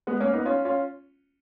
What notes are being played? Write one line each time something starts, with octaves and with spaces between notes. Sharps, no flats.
G#3 B3
A#3 C#4
B3 D#4
C#4 F4
C#4 F4